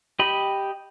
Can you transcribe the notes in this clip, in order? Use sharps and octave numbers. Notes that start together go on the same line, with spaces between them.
G4 D#5 B5